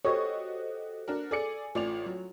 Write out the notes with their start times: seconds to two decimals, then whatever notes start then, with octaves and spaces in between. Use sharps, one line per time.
0.05 F#4 G4 A4 C5 C#5 D#5
1.08 D4 F#4 A#4
1.31 G#4 A4 D5 G#5 C#7
1.75 A1 F4 D5 F7
2.06 F#3